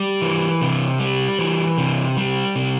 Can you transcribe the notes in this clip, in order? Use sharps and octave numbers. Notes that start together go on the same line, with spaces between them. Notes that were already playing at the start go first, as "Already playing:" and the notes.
Already playing: G3
E3
C3
G3
E3
C3
G3
C3